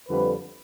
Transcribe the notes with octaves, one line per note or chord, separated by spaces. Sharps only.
F2 D3 G3 C4 B4